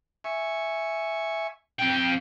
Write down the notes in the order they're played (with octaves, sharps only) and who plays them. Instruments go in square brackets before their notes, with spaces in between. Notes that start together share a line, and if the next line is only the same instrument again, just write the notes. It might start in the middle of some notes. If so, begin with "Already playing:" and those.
[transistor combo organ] E5 G#5 C#6
[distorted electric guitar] F2 G5